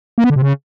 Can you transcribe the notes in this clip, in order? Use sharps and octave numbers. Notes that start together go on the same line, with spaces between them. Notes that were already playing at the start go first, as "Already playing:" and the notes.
A#3
B3
D3
C3
C#3